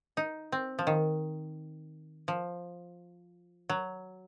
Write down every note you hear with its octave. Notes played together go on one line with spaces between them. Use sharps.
D#4
C4
F3
D#3
F3
F#3